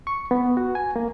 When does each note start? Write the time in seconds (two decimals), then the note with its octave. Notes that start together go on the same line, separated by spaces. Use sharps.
0.07 C#6
0.31 B3
0.57 F#4
0.75 G#5
0.96 A#3